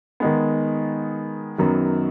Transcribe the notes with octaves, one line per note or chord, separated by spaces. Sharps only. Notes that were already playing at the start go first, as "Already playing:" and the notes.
D#3 G#3 B3
F#2 D#3 F#3 B3